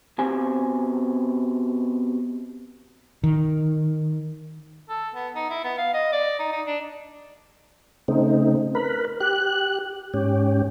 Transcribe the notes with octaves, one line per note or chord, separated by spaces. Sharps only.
B2 C4 G4 G#5
D#3
A4
B3
D#4
E4
B3
F5
D#5
D5
D#4
D#4
D4
C#3 A3 C4 D#4
A#4 B4 B5
G4 F#6
G#2 C#4 G4